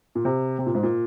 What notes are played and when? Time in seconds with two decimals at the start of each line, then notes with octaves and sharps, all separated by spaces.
0.15 A#2
0.25 C3
0.59 C3
0.66 A#2
0.75 G#2
0.83 A#2